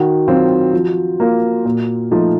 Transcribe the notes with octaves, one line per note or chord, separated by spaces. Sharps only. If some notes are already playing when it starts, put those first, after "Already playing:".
Already playing: D#3 F#4
F#3 C4 F4
F3
A#3 F4
A#2
F3 A3 D#4